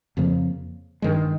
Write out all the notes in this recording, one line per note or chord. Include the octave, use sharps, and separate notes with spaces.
F2 C#3 F3 A#3
G2 D#3 G#3